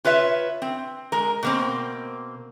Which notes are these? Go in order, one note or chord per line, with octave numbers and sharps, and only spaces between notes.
F4 B4 C#5 E5
C4
G#3 A#4
B2 A#3 C4